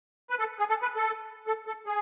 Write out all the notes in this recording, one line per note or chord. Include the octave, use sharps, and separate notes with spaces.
B4
A4
G#4
A4
B4
A4
A4
A4
G#4